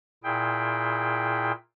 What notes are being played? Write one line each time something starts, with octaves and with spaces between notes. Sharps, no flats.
A#2 E4 G#4 G5